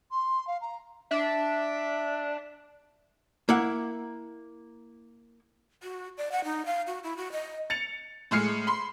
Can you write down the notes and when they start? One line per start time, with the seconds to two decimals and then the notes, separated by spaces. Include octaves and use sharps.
0.11 C6
0.47 F5
0.61 A#5
1.11 D4 E5
3.49 A#3 E4 F#5
5.83 F#4
6.18 D5
6.32 F#5
6.44 D#4
6.66 F5
6.87 F#4
7.04 E4
7.17 F#4
7.32 D#5
7.70 A6 C#7 F7
8.31 A2 G#3 G#4 F6 C7 C#7
8.67 B5 C6